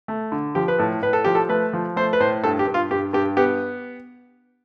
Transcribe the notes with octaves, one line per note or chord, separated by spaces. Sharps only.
A3
D3
F3 G4
B4
A2 A4
A2 B4
A4
F3 G4
A4
A3 B4
F3
A3 C5
B4
A2 C5
G2 A4
G4
G2
F4
G2 G4
G2 G4
B3 G4